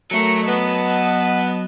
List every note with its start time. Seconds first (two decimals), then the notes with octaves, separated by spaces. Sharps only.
0.11 F#3 A3 A#4 C#7
0.47 B3 D#5 A5